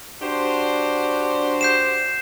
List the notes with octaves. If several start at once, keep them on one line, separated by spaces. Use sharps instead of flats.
D4 F#4 G4 C5
G6 C7 E7